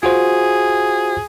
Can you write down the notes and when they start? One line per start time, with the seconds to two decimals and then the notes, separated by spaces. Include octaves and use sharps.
0.03 F4 F#4 G#4 C5